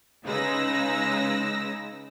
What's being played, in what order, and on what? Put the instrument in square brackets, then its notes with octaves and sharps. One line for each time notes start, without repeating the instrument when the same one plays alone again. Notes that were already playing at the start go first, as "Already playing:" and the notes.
[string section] C#3 G#3 D#4 B4 E6 A#6